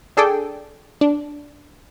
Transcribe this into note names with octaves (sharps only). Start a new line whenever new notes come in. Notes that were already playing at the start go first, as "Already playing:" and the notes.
D4 G#4 A4 D5 G5
D4